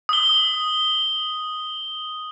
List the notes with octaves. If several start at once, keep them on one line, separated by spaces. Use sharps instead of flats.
D#6 G7